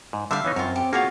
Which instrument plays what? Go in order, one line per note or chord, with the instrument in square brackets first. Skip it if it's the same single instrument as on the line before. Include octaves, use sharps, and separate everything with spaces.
[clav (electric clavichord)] G#2
[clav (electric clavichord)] D3 G3 [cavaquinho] E5 F5
[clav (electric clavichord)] E3 B3 D#4 [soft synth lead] C#5
[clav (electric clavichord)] F#2 [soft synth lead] C4 [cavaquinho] F4 C#5
[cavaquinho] G4
[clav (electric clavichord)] A#3 F5 [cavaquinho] F4 F#4 C#5 [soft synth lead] G#4